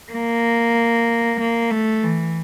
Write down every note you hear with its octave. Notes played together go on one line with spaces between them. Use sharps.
A#3
A#3
A3
E3